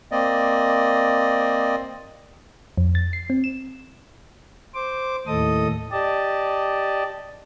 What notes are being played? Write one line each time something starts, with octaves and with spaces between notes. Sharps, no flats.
A#3 C4 D5 D#5
F2
A6
C7
C4
E7
C5 D6
D#2 A2 A4 D#5 D#6
G4 D5 D#5 A5